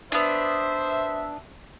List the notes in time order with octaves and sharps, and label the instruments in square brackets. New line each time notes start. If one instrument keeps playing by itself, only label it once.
[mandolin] B3 D4 [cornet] C5 [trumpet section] E5